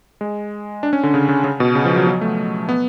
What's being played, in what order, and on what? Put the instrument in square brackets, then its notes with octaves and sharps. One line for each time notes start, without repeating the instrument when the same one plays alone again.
[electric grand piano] G#3
D4
C#4
D3
C#3
C#3
C#3
B2
C#3
F3
F#3
F#3
A3
B3